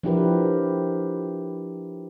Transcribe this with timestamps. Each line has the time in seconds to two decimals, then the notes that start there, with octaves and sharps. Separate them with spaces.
0.03 F3 D4 E4 G4 A#4 B4